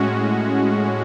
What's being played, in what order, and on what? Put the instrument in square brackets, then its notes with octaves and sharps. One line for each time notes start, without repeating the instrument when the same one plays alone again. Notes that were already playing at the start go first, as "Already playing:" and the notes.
Already playing: [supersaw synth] A2 G#3 C#4 F#4